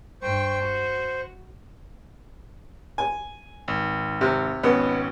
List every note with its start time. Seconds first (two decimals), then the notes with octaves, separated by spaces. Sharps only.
0.22 G2 C5 G5 C#6
0.62 F#4
2.98 G#5
3.68 G#1
4.21 C3
4.63 G#1 B2 B3 C#4